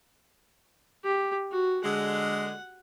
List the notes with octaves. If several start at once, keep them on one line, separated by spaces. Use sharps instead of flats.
G4
F#4
D3 G#3 F#5